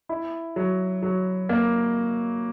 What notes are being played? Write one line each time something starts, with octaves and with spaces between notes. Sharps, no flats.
E4
F#3
F#3
A#3